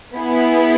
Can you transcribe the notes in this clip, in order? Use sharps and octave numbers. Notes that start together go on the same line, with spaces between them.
B3 E4 G#4